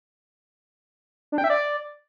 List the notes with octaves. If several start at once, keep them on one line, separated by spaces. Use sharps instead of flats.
D4
G5
E5
D5